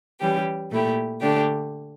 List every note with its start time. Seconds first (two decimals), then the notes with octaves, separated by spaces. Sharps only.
0.20 E3 G3 C#4 G4
0.71 A#2 A3 E4 G4
1.21 D3 A3 D4 G4